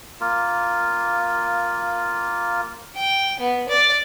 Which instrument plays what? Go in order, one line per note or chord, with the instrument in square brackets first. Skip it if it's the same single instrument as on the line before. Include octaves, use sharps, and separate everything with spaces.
[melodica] A#3 F4
[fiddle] G5
B3
D5